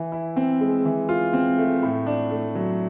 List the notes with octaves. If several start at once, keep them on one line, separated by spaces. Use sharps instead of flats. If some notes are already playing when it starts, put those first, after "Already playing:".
Already playing: E3
E4
C4
G#3
E3
F4
C4
A3
A2
D4
A3
F#3